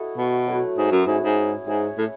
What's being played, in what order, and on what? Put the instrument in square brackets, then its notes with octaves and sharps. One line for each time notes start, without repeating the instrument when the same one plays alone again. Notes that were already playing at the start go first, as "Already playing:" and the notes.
Already playing: [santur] E4 F#4 A4 D#5
[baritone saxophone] B2
[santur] F#3 A3 E4 B4
[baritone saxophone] G#2
F#2
[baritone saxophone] G#2 [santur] C#4 E4 G#4
[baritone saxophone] G#2
[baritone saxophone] G#2 [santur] E4 G#4 C#5 E5
[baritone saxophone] A2